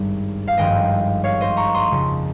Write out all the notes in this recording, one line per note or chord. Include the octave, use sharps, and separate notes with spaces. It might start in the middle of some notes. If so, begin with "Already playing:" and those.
Already playing: G#1 G2 G3
F5
G#1 G2 F3 D#5 G5
C#5 F5
C5 D#5
A#5 C#6
C6 D#6
F2 C#3 F3